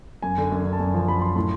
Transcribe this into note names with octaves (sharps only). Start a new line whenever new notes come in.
F#2 G#5
D3
F#2
D3
A5
F#2 G#5
F3 A5
F#2 B5
F#2 C6
A2 C6